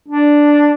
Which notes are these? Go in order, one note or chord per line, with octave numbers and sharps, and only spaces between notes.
D4